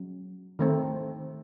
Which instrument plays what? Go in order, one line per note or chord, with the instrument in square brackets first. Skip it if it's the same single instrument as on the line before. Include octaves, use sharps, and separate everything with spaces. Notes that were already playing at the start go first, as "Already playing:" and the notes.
Already playing: [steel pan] F#3 C#4
D#3 A3 C4